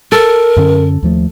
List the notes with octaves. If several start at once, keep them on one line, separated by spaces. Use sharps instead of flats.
A4 A#4
F#2 D3 C#4
D#2 F3 A3